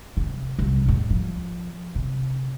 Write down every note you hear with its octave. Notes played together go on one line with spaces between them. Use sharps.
C3
C2
E2 G#2
F3
C3